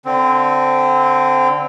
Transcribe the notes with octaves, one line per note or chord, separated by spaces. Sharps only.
D3 C4